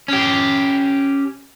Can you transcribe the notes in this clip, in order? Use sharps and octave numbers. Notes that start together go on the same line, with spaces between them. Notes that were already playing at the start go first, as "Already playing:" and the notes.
C#4 G4